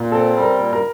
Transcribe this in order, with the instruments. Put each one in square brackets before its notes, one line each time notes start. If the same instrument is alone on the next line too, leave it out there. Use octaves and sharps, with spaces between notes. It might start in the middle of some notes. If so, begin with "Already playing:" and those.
Already playing: [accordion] A#2
[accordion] C4 [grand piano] A4
[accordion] G3
[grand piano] A#4
[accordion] A#2
[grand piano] A#4